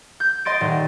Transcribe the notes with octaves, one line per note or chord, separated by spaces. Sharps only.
G6
D#5 C6 A6 D7
D#1